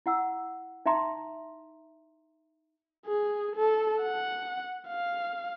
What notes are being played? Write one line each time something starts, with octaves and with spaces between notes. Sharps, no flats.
E4 F#5 E6
D#4 E5 A#5 C6
G#4
A4
F#5
F5